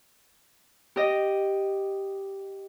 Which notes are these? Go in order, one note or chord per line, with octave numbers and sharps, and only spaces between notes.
G4 D#5